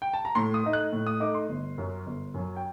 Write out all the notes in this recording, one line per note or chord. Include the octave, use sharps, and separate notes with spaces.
G5
A5
A#5
A2 C6
D#6
A3 D#4
F#6
A2
D#6
A3 D#4 D6
C6
G1
F#2 F#3
G1
F#2 F#3
G5